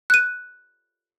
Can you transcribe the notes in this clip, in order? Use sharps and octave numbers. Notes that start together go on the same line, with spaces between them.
F#6 D#7